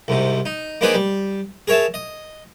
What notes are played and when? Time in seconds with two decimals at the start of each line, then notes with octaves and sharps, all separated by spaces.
0.08 C2 G#2 C3
0.46 D#4
0.81 A#3 C4 D4 D#4 G#4 B4
0.94 G3
1.68 G#4 A#4 C#5 E5 A5
1.94 D#5